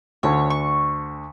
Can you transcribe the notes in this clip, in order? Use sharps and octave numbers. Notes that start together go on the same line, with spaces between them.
D2 D3 C#5
C#6